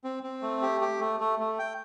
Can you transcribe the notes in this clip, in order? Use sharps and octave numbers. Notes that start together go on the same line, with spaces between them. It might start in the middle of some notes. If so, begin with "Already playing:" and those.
C4
C4
A3
G4
G4
A3
A3
A3
G5